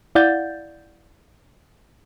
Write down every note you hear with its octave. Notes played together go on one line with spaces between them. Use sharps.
E4 D5 F5 F#5 G6 A6